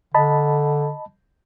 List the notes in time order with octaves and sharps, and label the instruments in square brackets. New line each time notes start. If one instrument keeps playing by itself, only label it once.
[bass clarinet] D3 [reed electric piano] D#5 A5 B5